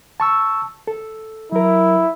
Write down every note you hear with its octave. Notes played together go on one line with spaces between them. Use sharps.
A5 C#6 E6
A4
F#3 E4 A#4